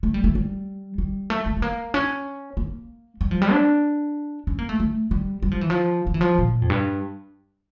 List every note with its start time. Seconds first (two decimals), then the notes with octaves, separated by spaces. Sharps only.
0.03 A3
0.14 G3
0.24 A3
0.35 G3
0.98 G3
1.30 A3
1.46 A3
1.57 A3
1.62 A#3
1.94 C#4
2.57 A#3
3.21 G3
3.31 F3
3.42 G3
3.52 D4
4.47 C#4
4.59 A#3
4.69 A3
4.80 A3
5.11 G3
5.42 G3
5.51 F3
5.61 E3
5.70 F3
6.07 F3
6.14 E3
6.21 F3
6.38 A#2
6.62 F2
6.70 G2